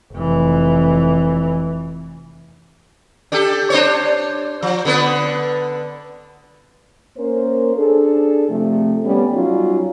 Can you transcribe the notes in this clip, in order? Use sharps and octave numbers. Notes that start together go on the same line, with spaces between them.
F1 E3
D4 G4 A4
D4 C5 C#5
F3
D3 B3 B4
A#3 C#4 A#4 C5
D4 G#4 A4
C3 F3 A3
G3 B3 C#4
F#3 G3 C#4 D#4 F4